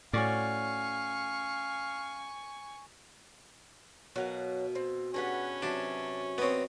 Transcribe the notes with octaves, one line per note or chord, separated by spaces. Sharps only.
A2 C#4 F#4 D5 F5 G#5 C#6
B2 F#3 A#4 F5 F#5
C4
C#4 D4 G4 G#4 B4 F#5
C3 F#3 D4 A5
B3 C4 C#5 D#5